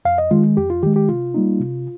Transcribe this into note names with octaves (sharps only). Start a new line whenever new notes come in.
F2 F5
D#5
D#3 G#3 F4
F2 G4
F4
D#3 G#3 G4
G4
C3 F4
G3 A#3 D#4
C3